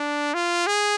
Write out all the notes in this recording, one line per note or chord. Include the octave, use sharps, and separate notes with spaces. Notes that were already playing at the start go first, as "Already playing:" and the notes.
Already playing: D4
F4
G#4